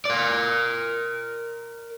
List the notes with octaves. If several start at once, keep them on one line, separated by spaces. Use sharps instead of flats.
A#4 D5